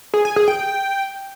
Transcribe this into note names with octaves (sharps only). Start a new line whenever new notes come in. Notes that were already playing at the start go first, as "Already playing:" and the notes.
G#4
G#5
G#4
G5